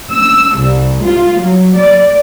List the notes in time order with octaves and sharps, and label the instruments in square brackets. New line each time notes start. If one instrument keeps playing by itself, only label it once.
[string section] E6
C2
F4
F#3
D5